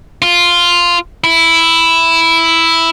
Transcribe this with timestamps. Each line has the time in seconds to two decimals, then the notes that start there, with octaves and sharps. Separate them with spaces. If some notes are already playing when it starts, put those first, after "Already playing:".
0.22 F4
1.24 E4